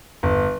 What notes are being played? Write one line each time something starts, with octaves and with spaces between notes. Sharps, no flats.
G1